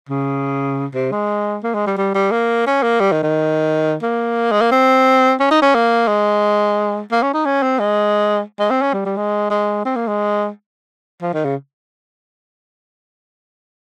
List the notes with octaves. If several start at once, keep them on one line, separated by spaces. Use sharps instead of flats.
C#3
C3
G#3
A#3
G#3
G3
G3
G3
A#3
C#4
A#3
G3
D#3
D#3
A#3
G#3
A#3
C4
C#4
D#4
C#4
A#3
G#3
A#3
C#4
D#4
C#4
C4
G#3
G#3
C4
C#4
G3
G3
G#3
G#3
C4
A#3
G#3
F3
D#3
C#3